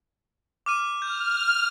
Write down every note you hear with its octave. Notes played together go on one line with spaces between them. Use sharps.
D6 F6 D#7
F6 G6